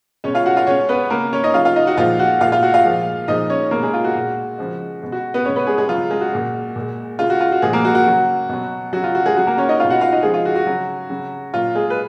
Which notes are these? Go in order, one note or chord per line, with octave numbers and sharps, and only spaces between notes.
B2 G#3 C#4 C#5
F4 F5
F#4 F#5
F4 F5
B2 G#3 C#4 C#5
B3 B4
C#3 G#3 A#3 A#4
C#4 C#5
D#4 D#5
C#3 F#3 F4 F5
F4 F5
D#4 D#5
F#4 F#5
A#2 F3 G#3 F4 F5
F#4 F#5
A#2 G#3 F4 F5
F4 F5
F#4 F#5
F4 F5
A#2 F3 G#3
A#2 F3 G#3 D#4 D#5
C#4 C#5
B2 G#3 A#3 A#4
G#3 G#4
F4
F#4
A#2 G#3
C#3 F3 G#3
B2 G#3
F#4
B3 B4
B2 G#3 C#4 C#5
B3 B4
G#3 G#4
G#3 G#4
C#3 F#3 F4
G#3 G#4
F#4
A#2 G#3
A#2 G#3
C#3 G#3 F4
F#4
F4
F#4
A#2 F3 G#3 G#4
A#3 A#4
F#4
F#4
C#3 F#3
B2 F#3
C#3 F#3 F#4
F4
F#4
G#3 G#4
C#3 F#3 F#4
A#3 A#4
C#4 C#5
D#4 D#5
B2 G#3 F4 F5
F#4 F#5
F4 F5
D#4 D#5
C#3 F3 G#3 G#4
F4
F#4
F#4
C#3 F#3
C#3 F#3
A#2 F#3 F4
G#3 G#4
B4